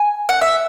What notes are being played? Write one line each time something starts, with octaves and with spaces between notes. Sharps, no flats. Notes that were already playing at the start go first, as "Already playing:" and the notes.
Already playing: G#5
F#5
E5